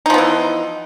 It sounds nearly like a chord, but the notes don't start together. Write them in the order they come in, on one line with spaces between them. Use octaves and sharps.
D#4 F3 B3 E3